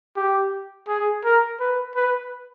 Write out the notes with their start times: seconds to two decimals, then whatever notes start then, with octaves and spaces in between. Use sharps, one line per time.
0.17 G4
0.88 G#4
1.24 A#4
1.60 B4
1.95 B4